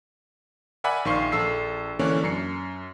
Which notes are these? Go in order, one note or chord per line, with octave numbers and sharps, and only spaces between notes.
A#4 D5 E5 F#5 G#5 B5
A#1 D#3 F5 C6 C#6 C7
A#1 A4 E6 C7
D3 E3 A#3 C#4 D4 C#5
F#2 C7 C#7